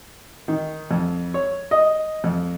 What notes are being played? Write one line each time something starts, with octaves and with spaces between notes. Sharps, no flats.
D#3
F2
C#5
D#5
F2